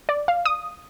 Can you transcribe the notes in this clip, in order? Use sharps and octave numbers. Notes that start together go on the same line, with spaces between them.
D5
F5
D#6